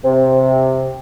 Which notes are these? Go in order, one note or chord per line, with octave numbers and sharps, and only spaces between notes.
C3